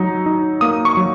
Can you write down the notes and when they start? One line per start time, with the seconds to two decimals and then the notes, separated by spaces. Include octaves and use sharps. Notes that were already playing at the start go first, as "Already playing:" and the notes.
Already playing: F#3 D#4
0.26 D#4
0.61 A#3 D#6
0.85 C#6
0.97 F#3